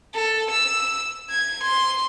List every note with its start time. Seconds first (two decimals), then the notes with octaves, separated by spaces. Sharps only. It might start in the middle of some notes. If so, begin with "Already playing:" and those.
0.14 A4
0.51 E6
1.30 G#6
1.64 C6